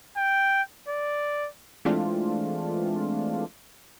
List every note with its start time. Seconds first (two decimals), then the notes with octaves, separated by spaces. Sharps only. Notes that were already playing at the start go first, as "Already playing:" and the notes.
0.17 G5
0.88 D5
1.85 E3 G#3 A3 C4 D4 F4